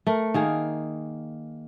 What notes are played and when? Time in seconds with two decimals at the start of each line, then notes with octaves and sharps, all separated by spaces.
0.07 A3 A#4
0.34 D#3 A#3 G#4